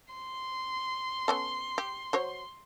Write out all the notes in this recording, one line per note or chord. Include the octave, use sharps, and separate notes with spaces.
C6
B3 C#4 A4
G4
F#3 C5 C#5